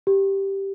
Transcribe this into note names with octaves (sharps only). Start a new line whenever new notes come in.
G4